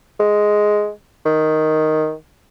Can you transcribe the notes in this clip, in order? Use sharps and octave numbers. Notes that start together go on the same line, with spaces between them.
G#3
D#3